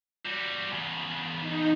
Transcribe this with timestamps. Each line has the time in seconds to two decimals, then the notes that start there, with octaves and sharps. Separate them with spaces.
0.25 G3 F#4
0.72 E2 C#3
1.41 D#4